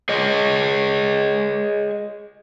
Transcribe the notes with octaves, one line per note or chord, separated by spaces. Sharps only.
G#4 C#5 D#5